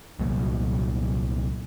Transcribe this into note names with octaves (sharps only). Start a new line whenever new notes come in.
C2 A#2 F#3